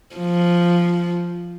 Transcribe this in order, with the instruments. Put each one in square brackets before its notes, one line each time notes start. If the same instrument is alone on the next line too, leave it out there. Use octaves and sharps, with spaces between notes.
[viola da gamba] F3